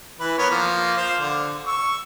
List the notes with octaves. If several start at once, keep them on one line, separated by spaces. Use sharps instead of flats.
E3 B4
B3 A#4 C#5
F3 A#3
C5 F5
D3
C#6 E6